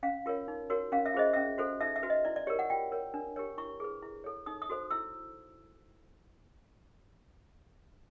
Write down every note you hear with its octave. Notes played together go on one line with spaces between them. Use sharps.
C#4 F5
F4 A#4 C#5
D#4
F#4 A#4 C#5
C#4 F5
E5
F4 G#4 C5 D#5
C#4 E5
F#4 A4 C5
D#4 E5
E5
F#4 B4
D#5
E4 D5
D5
G4 A#4 C#5
F#5
F4 G5
A#4 C#5
D4
G4 A#4 C#5
E4 C#6
G#4 B4
E4
A4 C#5
D#4 D#6
D#6
F#4 A4 C5
E4 E6